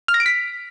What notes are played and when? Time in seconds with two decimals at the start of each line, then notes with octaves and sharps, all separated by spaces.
0.08 F6
0.14 A#6
0.20 D7
0.26 B6